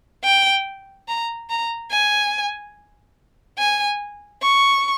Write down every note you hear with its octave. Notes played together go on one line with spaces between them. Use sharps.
G5
A#5
A#5
G#5
G#5
C#6